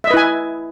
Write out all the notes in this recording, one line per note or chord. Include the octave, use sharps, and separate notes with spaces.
E4 B4 D#5 E5 G#5